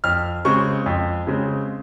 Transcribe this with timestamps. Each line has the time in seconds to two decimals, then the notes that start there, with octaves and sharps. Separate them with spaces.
0.04 F2 F6
0.45 C#3 G#3 C4 C#6
0.86 F2
1.27 C#3 G#3 C4